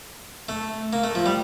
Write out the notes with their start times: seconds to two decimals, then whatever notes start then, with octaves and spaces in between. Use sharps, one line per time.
0.49 A3
0.93 A#3
1.04 A3
1.15 F3
1.26 G3